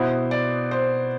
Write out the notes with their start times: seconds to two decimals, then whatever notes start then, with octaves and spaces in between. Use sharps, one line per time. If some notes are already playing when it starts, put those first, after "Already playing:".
Already playing: B2 B3 E4 C5
0.31 D5
0.71 C5